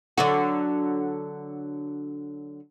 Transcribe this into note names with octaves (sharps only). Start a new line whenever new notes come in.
D3 F#3 F#4